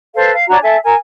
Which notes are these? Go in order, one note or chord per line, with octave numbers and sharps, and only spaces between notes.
A4 B4 C5 F5
F5
D4 F#4 C#5 A#5
A4 E5 G#5
A#4 G#5